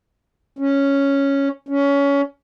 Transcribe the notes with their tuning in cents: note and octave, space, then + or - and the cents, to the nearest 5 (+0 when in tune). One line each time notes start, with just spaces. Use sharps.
C#4 +0
C#4 +20